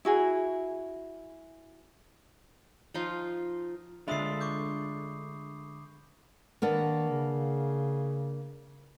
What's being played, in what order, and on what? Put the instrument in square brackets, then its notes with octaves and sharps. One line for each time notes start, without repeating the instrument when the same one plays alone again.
[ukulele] E4 F#4 G#4
[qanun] F3 D#4 F4
[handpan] D3 E5 [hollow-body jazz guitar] G#3 D4 F4 [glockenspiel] B5 D#6 C7
[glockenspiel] C#6 D6 G6
[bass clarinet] D#3 [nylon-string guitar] A#3 B3 D4
[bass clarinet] C#3